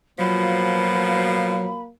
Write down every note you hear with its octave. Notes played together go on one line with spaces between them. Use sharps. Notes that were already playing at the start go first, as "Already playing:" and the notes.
B2 F3 F#3 A#3 B5